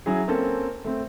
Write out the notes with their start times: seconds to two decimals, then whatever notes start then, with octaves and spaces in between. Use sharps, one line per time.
0.06 F#3 C#4 E4 G#4
0.28 A#3 C4 C#4 A4
0.85 A3 C4